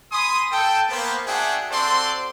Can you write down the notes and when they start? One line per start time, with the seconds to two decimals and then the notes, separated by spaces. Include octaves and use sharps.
0.12 G#5 B5 C6 D#6
0.52 A4 G5
0.90 A#3 B3 C5
1.27 D4 F#4 G#4 E5 F#5 G5
1.71 C4 F#4 A4 C5 D5 C6